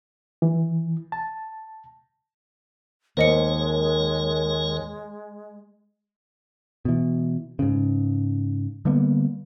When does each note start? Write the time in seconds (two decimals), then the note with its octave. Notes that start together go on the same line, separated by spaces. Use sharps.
0.42 E3
1.12 A5
3.17 D#2 G#3 A#4 C5 C#5 D#5 C#7
6.85 B2 E3
7.59 G#2 C#3
8.85 D3 G3 A#3 B3